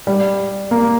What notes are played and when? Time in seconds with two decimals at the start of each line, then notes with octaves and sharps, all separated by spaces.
0.07 G3
0.71 A#3